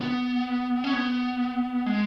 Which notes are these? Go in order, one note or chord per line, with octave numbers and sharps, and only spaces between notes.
B3
C#4
B3
G#3